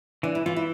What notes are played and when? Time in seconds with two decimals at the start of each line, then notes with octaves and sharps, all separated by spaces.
0.23 E3 D4
0.35 E4
0.46 E3 F4
0.56 E4